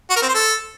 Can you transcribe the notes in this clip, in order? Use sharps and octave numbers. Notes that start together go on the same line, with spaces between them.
F#4
A#4
C4
C5
A4